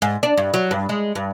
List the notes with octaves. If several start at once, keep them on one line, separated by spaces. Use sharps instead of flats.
G#2
D4
G2
F#3
G2
G#3
G2